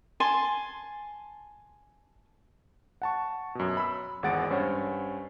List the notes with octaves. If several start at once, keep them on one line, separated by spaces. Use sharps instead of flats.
G#5 A5 C6
F#5 A5 C#6
F#2 B2
B5 E6
G#1 E2 G#3 F#5 A6 D7
G2 C#4 C5 C#5 F#5 G#5